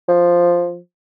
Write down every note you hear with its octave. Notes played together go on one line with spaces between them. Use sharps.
F3